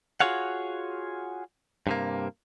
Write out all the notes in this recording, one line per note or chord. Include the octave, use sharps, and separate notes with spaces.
F4 F#4 G#4 C#5 F5 F#5
G2 C3 A#3